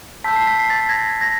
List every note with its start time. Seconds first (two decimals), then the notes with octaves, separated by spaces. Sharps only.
0.24 A5 C6 E6 G6 B6
0.36 C7
0.47 B6
0.59 C7
0.70 A6 B6
0.89 G#6 A#6
1.21 G#6 A#6